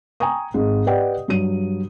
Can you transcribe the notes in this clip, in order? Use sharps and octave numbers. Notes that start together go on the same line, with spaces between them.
G5 G#5 A#5 C#6 D#6
G#1 G#2
G4 B4 D5 D#5 F#5 G5
G2 F#3 D#7